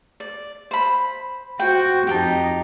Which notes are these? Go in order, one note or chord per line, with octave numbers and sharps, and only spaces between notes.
D5
C5 B5
F#4 C5 G5
F2 D#4 G4 G5 A5